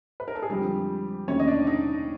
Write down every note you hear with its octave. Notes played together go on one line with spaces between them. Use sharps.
B4
A#4
A4
G#4
F2 D3 F3 G3 G#3 G4
D#2 D3 F#3 A3 C#4 C#5
D#5
D4 D5
D#4 D#5